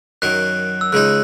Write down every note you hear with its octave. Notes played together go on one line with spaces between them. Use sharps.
F#2 D#3 F#3 F#6
E6
C#2 C#3 G#3 D#4 F#6